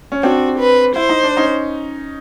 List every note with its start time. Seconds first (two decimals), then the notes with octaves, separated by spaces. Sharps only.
0.12 C#4
0.23 C4 D4 F#4
0.59 B4
0.96 E4 C5
1.09 D#4
1.23 D4
1.37 C#4 D#4